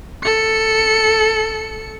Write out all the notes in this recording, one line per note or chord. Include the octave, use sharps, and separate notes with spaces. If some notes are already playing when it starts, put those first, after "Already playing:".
A4 C#7